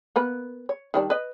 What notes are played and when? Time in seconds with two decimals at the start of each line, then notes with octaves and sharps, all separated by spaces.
0.16 A#3 B3 B4
0.69 C#5
0.94 D#3 G3 D4
1.10 B4 D#5